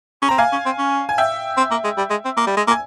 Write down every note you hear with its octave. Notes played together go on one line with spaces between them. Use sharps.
C#4
C4 A#5
A#3 F5 G#5
C#4
C4
C#4
G#5
E5 G5
C4
A#3
G#3
G3
G#3
C4
A#3
G3
G#3
A#3
G#5